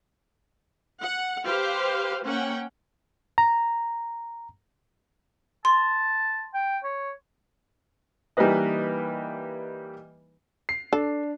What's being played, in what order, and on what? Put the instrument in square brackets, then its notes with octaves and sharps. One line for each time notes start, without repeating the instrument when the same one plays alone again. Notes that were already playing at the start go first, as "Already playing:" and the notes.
[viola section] F#5
G4 B4 C5 F5
A#3 C#4 F#5 G5
[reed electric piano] A#5
[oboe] A5 [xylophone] C6
[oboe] G5
C#5
[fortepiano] E3 G3 A#3 D#4 B4 D#5
[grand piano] C7
[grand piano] D4 [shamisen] A4